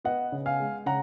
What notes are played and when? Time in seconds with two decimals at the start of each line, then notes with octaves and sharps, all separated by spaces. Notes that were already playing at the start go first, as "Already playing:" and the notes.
0.04 B3 D#5 F#5
0.32 C#3
0.46 F5 G#5
0.60 G#3
0.86 C#3 F#5 A#5